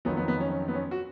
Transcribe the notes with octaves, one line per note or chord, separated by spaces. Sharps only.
F2 D#3 F#3 B3
B3
B3
C#4
C#4
B3
C#4
F#4